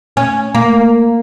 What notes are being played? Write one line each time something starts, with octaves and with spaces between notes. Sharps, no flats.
C#4
A#3